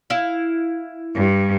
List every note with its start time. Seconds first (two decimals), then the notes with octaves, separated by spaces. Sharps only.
0.10 E4 F5
1.14 G2